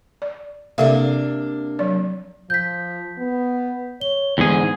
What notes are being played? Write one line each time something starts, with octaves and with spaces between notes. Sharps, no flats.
D5
C3 A#3 D4 A4 E5 F5
F#3 D5
F3 G6 B6
B3
C#5 G7
E2 G#2 D3 G#4